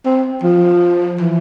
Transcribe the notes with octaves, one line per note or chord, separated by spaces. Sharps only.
C4
F3
E3